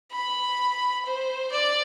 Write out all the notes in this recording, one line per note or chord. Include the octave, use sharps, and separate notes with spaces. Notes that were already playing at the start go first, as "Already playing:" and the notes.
B5
C5
D5